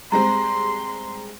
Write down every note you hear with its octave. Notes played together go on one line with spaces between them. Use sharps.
G3 G#3 C4 A#5 C6